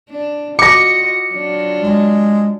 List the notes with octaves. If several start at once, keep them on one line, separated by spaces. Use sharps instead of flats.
D4
F4 F#4 D#5 D6 A#6 C#7
F#3 D4 F4
G#3